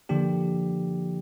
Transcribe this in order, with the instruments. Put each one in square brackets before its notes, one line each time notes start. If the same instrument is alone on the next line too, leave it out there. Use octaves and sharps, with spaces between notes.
[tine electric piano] D3 F3 A#3 D4 G4